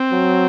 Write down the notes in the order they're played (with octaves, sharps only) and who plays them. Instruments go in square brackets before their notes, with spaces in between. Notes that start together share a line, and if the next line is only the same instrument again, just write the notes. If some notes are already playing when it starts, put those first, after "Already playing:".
Already playing: [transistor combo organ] C4
[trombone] F#3